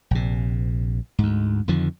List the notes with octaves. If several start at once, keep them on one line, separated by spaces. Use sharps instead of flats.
A#1 C3
D2 G#2
F2 D3 D#3 F3